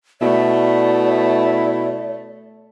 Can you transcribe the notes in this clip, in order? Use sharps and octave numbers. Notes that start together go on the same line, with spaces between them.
B2 A3 E4 D5